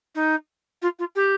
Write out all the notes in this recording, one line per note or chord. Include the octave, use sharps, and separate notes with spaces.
D#4
F4
F4
G4